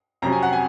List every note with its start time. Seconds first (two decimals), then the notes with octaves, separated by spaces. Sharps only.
0.22 F2 C3 F#3 C#4 A#5
0.32 G#5
0.43 F#5
0.53 G#5